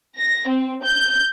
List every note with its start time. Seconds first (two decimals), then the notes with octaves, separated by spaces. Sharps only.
0.17 A#6
0.48 C4
0.85 G6